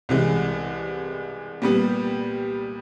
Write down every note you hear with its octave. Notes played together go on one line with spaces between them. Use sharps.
C2 C3 E3 G#3
A#2 G3 B3